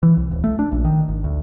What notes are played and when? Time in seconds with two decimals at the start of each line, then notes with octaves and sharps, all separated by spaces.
0.03 E3
0.17 C2
0.31 D1
0.44 A3
0.59 D4
0.72 A#1
0.85 D#3
1.08 G#1
1.24 D2